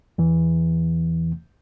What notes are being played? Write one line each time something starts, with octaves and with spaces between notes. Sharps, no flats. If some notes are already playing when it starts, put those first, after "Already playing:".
E2 E3